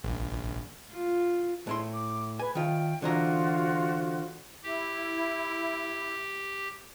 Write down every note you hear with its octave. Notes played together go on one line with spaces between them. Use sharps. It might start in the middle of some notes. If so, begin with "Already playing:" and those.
A#1
F4
A2 E4 C6
D6
B4 G#5
D#3 F4 G5
D3 E3 F4 F#4 C5 A#5
E4 G4